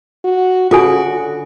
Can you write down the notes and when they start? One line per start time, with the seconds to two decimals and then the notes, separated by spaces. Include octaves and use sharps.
0.25 F#4
0.71 C#3 F4 F#4 A4 G#5
1.07 D3